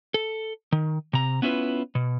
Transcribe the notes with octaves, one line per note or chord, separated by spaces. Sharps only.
A4
D#3
C3 A#5
B3 C#4 E4 F4 B4
B2